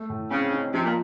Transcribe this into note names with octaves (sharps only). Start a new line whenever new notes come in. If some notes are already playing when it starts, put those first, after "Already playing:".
Already playing: A3
A2
C#3 C4
D#4
C3 F3
A#2